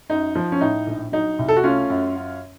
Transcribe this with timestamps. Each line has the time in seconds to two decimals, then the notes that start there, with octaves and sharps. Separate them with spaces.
0.10 F#2 D#4
0.35 F3
0.52 C#4
0.61 A2 D#4
0.87 A#1
1.12 F#3 D#4
1.39 C2
1.48 A4
1.57 F#4
1.64 A3 C#4 F4
1.90 F#2
2.16 F#2